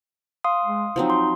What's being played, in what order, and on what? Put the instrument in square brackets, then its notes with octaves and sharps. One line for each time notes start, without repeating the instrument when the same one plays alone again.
[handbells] F5 C6 D#6
[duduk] G#3
[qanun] F3 F#3 C4 [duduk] D#4
[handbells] C6